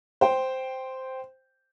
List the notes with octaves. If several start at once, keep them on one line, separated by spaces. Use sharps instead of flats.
C5 G5